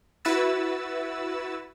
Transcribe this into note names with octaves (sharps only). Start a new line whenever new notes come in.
E4 F#4 B4 E6 A6